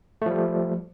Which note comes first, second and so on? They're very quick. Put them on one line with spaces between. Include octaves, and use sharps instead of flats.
A3 F3 G3